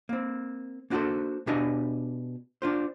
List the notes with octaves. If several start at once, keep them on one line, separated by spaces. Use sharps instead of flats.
A#3 C4
A#3 D4 F#4 G4 A4 C5
B2 D4 G4 D#5 F5 G#5
D4 F4 C5